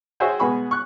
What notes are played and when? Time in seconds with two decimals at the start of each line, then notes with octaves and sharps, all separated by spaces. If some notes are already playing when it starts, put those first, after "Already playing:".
0.20 F#4 G#4 C5 C#5 E5 G5
0.39 B2 G#3 B3 G#4 B5 C#6
0.71 C#6 F#6